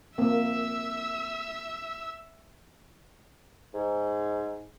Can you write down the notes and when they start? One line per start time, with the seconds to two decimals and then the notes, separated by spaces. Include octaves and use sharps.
0.18 A#3 C4 E5 E6
3.74 G#2